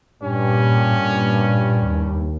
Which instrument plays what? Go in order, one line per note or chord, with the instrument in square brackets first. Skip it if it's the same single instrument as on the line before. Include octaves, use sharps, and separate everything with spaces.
[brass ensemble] G2 G3 [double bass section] A#2 [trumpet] C#4
[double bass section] D#2